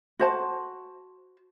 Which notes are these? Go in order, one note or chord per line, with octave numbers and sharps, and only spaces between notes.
F#4 C5 A5